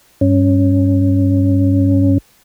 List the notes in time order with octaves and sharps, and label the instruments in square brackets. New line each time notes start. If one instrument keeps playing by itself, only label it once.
[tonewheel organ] G2 C#4